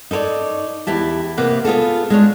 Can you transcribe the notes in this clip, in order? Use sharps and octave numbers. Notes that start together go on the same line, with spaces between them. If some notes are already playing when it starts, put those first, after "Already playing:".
D#4 A4 A#4 C#5 D5
E2 E4 G4 A5
C3 A#3 B3
B3 F4 G#4 A4
G#3 D4 C#5